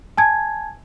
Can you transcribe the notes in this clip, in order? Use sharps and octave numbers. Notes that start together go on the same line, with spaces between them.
G#5 A5 G#6